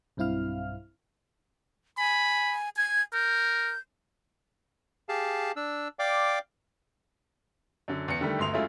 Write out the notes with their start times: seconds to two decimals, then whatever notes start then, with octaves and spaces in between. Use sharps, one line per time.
0.17 B1 G2 C4 E4 F5 F6
1.98 G#5 B5
2.77 G#5 G#6
3.13 A#4 G6
5.09 G4 G#4 F5 A5
5.56 D4 E6
5.99 D5 F5 G5 D6
7.88 F#2 D3
8.08 E2 C#7
8.21 D3 D#3 G3 A3
8.39 G1 D2 C6 F7
8.53 F#2 G#3 A3 E4 F4